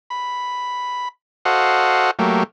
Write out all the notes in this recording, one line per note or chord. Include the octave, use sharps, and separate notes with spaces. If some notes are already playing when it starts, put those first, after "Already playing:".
B5
F#4 A4 C5 D#5 F5 F#5
F#3 A3 A#3 G4